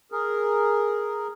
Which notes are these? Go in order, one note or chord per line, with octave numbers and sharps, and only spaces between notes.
G#4 A#4